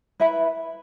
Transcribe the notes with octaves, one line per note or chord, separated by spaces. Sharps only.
E4 B4 E5 B5